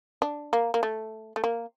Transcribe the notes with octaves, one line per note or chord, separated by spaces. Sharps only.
D4
A#3
A#3
A3
A3
A#3